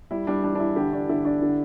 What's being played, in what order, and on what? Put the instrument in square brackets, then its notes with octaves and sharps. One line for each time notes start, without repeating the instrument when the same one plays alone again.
[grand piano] G3 [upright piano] E4
[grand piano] G3 [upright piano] D4
[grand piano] E3 [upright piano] D4
[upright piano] D4
[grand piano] E3 [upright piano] E4
[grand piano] D3 [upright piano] G4
[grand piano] D4
[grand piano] D3 [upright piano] E4
[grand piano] D4
D3